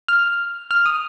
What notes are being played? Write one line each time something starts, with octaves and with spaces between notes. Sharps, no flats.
F6
F6
D#6